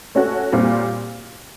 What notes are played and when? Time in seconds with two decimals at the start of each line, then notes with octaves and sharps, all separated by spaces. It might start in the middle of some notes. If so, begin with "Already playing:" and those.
0.15 A3 C#4 F#4
0.52 A#2 G3 C4